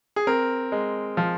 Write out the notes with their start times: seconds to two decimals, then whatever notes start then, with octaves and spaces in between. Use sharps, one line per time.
0.16 G#4
0.27 C4 A#4
0.72 G#3
1.17 F3